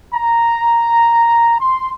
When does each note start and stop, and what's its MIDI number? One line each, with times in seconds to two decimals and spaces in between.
0.15 1.54 82
1.59 1.89 84